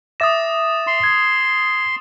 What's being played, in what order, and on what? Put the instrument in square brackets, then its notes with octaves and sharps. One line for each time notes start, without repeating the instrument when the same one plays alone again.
[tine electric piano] E5 D6 A#6 [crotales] D#6 A6 E7
[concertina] C6
[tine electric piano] G#6